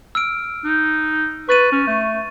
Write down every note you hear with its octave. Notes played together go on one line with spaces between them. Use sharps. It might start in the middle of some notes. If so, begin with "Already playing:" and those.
E6 F6 D7
D#4
B4 C#6 A6 D#7
C#4
A3